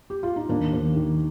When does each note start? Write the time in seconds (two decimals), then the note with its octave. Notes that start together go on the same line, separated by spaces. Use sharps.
0.10 G4
0.23 F4
0.36 D#4
0.49 D#2 A#3 D4
0.73 D#2
0.96 D#3